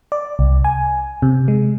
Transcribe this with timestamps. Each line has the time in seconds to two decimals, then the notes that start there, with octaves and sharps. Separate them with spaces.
0.12 D5
0.39 C2
0.64 G#5
1.22 C3
1.48 G#3